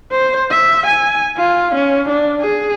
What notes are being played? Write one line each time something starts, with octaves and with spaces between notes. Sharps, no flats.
C5
E5
G#5
F4
C#4
D4
G#4